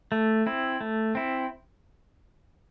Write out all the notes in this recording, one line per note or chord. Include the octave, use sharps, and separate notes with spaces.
A3
C4 E4
A3
C4 E4